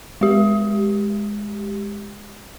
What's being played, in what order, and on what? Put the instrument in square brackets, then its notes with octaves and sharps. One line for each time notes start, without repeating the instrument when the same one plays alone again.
[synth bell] G#3 G4